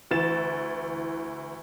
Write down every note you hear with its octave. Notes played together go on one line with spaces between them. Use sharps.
D2 E3 A6 E7